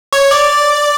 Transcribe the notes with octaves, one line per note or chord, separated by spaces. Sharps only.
C#5
D5